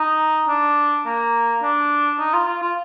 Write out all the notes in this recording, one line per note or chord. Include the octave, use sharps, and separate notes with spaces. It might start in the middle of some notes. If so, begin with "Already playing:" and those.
Already playing: D#4
D4
A#3
D4
D#4
F4
F4
F4